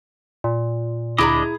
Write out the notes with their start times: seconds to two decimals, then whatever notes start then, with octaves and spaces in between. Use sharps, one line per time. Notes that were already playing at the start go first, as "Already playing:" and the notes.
0.44 A#2
1.18 D2 D4 E4 G#4 D#5 A#5 B5 D6